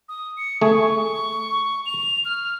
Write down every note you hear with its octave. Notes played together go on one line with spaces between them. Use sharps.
D#6
C#7
A3 G#4 C#6
F7
F6